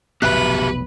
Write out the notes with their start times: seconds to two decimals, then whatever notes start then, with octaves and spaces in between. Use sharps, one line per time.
0.22 F1 B1 B3 F#4 G4 B4 E5 F#6